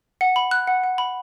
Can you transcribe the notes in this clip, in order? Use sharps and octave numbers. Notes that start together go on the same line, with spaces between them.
F#5
B5
F#6
F#5
F#5
B5